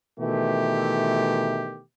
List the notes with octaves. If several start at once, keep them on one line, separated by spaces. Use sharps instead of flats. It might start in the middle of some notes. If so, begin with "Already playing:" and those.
B2 D#3 E3 A3 G4